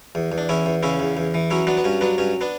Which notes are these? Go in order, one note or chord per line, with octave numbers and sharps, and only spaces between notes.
E2
E2
D4
E2 C#4 E4
E2
C#3 C#4 E4
E2
E2
E3
F#3 C#4 E4
F#3 B3 D4
B3
G2 C#4
F#3 B3 D4
G2 C#4
B3 D4